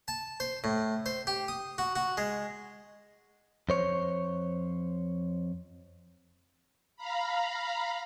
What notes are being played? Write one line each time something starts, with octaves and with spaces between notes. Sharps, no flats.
A5
C5
A2
C5
G4
D#6
F#4
F#4
G#3
F2 C5 C#5
F5 A#5 B5